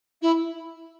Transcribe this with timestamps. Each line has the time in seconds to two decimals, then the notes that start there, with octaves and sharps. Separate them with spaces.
0.21 E4